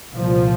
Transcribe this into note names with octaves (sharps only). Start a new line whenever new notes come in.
C2 A#2 F3